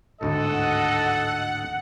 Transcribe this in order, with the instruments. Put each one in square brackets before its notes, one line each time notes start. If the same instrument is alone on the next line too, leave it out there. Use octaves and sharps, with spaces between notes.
[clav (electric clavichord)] G#1 D2 A2 [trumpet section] A4 D#5 [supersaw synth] F#5